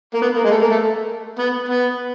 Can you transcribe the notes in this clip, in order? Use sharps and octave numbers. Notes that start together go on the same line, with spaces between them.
A#3
B3
A#3
G#3
A3
A#3
A3
B3
B3